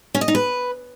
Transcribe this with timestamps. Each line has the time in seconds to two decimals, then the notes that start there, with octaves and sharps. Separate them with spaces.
0.15 C#4
0.21 D#5
0.28 D#4
0.35 B4